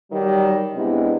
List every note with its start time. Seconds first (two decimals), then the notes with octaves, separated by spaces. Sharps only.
0.11 D#3 F#3 G3
0.75 C3 G#3 B3 D4 E4